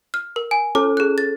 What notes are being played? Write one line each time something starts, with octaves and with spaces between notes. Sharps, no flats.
F6
A#4
G#5
C#4 A4 D6
G#4 F#6
A6